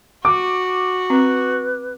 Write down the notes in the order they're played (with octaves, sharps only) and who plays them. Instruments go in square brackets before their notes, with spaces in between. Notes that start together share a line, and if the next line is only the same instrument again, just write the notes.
[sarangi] F#4 [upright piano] D6
[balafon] C4 [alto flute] B4